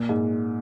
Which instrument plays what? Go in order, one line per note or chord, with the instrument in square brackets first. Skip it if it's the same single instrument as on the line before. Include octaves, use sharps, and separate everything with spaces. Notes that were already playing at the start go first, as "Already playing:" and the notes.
Already playing: [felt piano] A#2
G#2